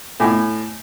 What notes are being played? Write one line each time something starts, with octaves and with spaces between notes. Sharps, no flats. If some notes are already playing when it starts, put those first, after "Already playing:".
A2 G#5 D6